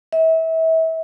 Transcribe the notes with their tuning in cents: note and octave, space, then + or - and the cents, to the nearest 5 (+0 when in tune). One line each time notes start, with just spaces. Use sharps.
E5 -30